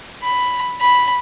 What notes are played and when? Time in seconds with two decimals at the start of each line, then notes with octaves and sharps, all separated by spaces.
0.22 B5
0.80 B5